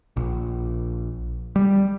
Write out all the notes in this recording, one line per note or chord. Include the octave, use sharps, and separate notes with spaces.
A#1
G3